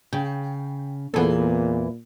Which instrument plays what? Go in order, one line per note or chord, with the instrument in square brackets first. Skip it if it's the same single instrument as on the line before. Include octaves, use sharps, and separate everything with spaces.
[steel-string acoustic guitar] C#3 [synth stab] G5
[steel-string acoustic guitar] E2 E3 [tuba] A#2 [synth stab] B3 G#4 A4